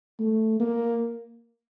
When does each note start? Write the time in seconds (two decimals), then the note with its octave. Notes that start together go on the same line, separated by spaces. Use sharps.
0.19 A3
0.60 A#3